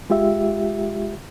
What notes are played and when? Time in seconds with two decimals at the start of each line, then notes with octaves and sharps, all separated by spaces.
0.10 G#3 F4 G4 E5